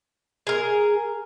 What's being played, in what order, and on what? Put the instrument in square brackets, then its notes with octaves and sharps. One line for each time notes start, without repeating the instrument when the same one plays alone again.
[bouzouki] G#4 A#4